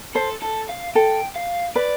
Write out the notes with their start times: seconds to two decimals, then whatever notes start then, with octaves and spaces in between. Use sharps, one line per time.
0.15 A4 C5
0.42 A4
0.69 F5
0.95 A4 G5
1.36 F5
1.76 B4 D5